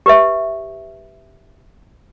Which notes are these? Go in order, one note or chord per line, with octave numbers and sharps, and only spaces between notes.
G4 B4 E5